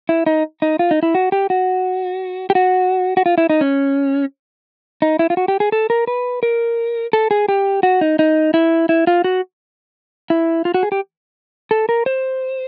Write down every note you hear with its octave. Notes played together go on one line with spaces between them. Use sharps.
E4
D#4
D#4
F4
D#4
E4
F#4
G4
F#4
G4
F#4
F#4
F4
E4
D#4
C#4
D#4
E4
F4
F#4
G4
G#4
A4
A#4
B4
A#4
A4
G#4
G4
F#4
D#4
D#4
E4
E4
F4
F#4
E4
F4
F#4
G#4
G4
A4
A#4
C5